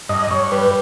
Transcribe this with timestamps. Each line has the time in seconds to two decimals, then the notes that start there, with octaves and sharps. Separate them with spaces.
0.09 G2 D#5
0.31 G2 C#5
0.52 G3 B4